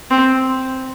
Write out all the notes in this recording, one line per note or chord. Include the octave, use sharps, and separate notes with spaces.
C4